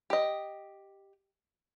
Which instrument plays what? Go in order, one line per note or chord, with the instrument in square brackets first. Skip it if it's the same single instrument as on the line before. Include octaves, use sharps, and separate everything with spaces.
[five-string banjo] G4 D#5